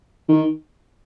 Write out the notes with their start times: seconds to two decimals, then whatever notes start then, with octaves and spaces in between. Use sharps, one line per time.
0.29 D#3